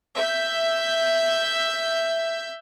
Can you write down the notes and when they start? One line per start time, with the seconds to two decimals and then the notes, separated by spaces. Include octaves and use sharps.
0.16 E5 G6